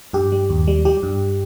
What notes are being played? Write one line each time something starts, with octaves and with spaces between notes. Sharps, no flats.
G2 G4
G3
D#2
G3
G3 G4
G2